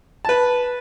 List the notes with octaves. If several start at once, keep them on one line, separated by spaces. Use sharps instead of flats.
B4 A5